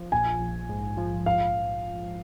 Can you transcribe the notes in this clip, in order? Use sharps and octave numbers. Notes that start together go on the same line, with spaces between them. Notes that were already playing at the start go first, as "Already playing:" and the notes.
Already playing: F3
A#1 G#5
A#1
G#2
F3
F5